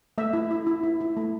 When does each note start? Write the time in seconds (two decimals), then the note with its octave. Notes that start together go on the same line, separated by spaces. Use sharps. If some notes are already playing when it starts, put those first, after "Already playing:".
0.18 A3 E5
0.33 E4
0.51 E4
0.67 E4
0.83 E4
1.01 E4
1.17 A3